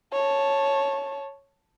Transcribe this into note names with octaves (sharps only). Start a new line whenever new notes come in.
C#5 A5